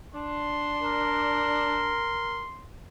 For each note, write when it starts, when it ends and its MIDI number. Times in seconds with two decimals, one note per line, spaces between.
0.14 1.97 62
0.14 2.68 84
0.82 2.47 70